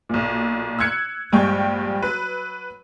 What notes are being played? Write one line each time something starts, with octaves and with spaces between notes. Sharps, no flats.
B1 A#2
E6 F#6 G#6 C#7
A#1 G2 G#3 G5 C#6
F#3 B4